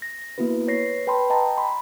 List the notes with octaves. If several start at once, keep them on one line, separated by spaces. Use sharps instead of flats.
A#6
A#3 B3 E4 F#4 B4
B4 C#5 A#6 C7
B4 G5 A5 B5 C6
D#5 G5 A5 A#5
B5 C6